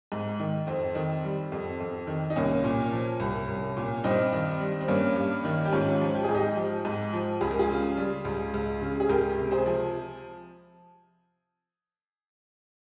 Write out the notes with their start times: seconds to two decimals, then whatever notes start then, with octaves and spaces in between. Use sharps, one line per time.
0.12 G#2
0.40 D#3
0.67 F2 C4
0.95 D#3
1.24 G3
1.52 F2
1.80 F2
2.07 D#3
2.30 D#4
2.36 C2 A#3 C#4
2.64 A#2
2.92 F3
3.20 C2
3.48 C2
3.77 A#2
4.04 G2 C4 D#4
4.33 D#3
4.60 G3
4.81 C4
4.88 G2 A#3 C#4
5.16 G2
5.45 D#3
5.65 G4
5.73 G#2 C#4 F4
6.01 F3
6.15 G4
6.24 G#2 G#4
6.35 D#4 G4
6.56 F3
6.85 G#2
7.13 F3
7.41 C#2 G#4
7.51 A#4
7.59 F4 G#4
7.69 C#3
7.97 G3
8.25 C#2
8.54 C#2
8.82 C#3
9.00 G#4
9.09 C#2 G4 A#4
9.37 C3
9.51 G#4 C5
9.66 F3